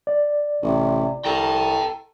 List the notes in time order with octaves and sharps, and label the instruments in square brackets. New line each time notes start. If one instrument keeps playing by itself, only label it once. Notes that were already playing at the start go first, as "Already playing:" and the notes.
[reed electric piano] D5
[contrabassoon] A1 [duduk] C3
[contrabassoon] C2 [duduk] A4 [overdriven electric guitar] G5 A#5